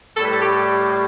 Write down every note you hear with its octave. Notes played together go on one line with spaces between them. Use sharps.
A2 G3 A4
B4
A4
G4